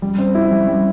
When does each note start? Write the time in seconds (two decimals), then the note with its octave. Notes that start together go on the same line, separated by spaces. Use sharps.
0.02 G3
0.18 C4
0.35 E4
0.51 G3
0.68 G3